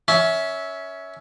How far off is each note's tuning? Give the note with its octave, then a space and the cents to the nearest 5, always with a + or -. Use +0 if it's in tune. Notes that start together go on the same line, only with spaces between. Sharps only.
C#4 +15 E5 -10